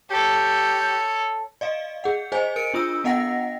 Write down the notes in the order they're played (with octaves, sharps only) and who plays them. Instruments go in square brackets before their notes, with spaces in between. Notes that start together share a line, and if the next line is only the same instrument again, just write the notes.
[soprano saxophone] G4 [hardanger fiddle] A4 C#5
[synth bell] D5 D#5 F5
G#4 F#5
G#4 C5 D#5 G#5
A#4 C#7 D7
D4 F4 D#6 E6
B3 D#5 F#5 G5 A#6